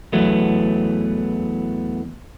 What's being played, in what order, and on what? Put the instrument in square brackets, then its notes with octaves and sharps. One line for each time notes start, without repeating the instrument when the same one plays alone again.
[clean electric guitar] E2 E3 F#3 A3 B3